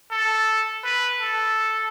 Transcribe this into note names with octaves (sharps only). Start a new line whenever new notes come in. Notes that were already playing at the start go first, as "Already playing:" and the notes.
A4
B4
A4